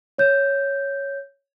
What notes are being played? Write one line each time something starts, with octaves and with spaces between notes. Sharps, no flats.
C#5 G6